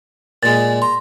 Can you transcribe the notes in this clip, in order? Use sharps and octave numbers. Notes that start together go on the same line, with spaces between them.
A#2 G#3 A6
A#5 C6